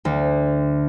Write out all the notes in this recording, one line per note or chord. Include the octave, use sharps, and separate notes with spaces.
D2